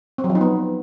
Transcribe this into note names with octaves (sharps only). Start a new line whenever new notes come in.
C4
F#3
F3
D#4
B3